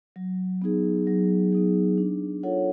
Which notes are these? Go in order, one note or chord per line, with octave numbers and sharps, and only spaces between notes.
F#3
B3 D#4 G#4
F#3
B3 D#4 G#4
D4
F4 A4 C#5 F#5